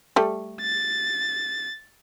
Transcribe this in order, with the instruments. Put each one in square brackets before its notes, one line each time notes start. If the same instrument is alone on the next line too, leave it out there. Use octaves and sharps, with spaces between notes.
[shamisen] G3 A3
[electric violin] A6